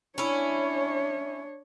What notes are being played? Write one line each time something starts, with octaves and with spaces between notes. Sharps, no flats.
C#4 D4 E4 C#5